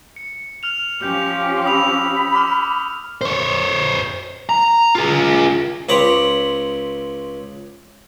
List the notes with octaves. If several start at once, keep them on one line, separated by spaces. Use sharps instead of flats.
C#7
F6 F7
F3 C#4 G4 G6 F7
B5 D#6 E6 F7
D6 F6
C5 C#5
A#5
F4 G#4
C#2 C4 C#5 A#5 B5 D6